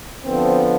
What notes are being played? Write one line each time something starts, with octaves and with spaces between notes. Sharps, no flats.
D3 F3 B3 C4